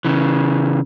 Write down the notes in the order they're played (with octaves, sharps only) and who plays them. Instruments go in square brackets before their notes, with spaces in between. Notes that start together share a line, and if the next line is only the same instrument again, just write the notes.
[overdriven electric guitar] C#3 E3